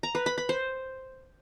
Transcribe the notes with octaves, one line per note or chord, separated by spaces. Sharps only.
A#5
B4
B5
B5
C5